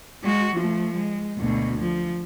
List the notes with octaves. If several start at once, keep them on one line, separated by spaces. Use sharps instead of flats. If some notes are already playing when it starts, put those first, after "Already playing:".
G#3 F#4
F3 A3
G#3
D2 B2
F3